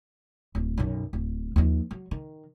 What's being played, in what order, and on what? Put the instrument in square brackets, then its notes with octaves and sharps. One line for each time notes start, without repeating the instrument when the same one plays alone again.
[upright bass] D1
B1 F#2
D1
D#2 F3
F#3
D#3